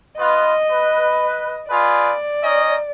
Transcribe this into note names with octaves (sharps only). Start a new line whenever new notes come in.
B3 F4 B4 D#5
B4
F4 G#4 B4 D5
C#4 D#4 D#5